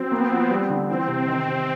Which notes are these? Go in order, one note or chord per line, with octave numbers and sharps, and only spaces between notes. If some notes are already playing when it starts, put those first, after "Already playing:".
Already playing: F#3 C4
A#3 B3
F3
G3
D3
E3 C4
C3
D#3
C3